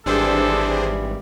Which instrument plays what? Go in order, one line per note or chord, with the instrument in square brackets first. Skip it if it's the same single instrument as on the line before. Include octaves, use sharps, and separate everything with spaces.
[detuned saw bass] G#1 [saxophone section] G2 E3 G3 [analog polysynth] D4 G#4 C5 [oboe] A4